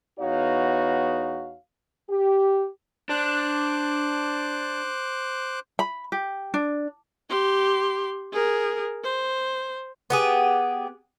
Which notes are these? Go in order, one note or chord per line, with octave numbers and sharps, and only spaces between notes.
E2 B3 D#4 F#4 C#5 F5
G4
D4 C5 D6 F#6
B5
G4
D4
G4 C6
G#4 A#4
C5
B3 G4 G#4